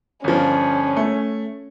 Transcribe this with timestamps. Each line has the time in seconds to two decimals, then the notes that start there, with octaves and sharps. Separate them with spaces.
0.24 G1 F3 C#4
0.97 A3